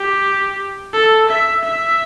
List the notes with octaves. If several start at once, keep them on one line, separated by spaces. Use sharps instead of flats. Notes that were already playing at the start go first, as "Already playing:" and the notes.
Already playing: G4
A4
E5
E5